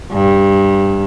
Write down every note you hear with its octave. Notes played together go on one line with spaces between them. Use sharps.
G2